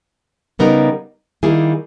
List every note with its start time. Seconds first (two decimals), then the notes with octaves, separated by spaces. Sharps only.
0.59 C#3 G3 B3 D#4 A#4
1.43 D#3 G3 A#3 E4 G#4